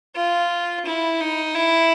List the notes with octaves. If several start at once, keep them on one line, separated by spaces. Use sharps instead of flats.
F4
E4
D#4
E4